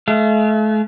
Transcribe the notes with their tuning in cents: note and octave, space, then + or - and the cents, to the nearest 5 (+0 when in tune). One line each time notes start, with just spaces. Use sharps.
A3 -40 F5 -40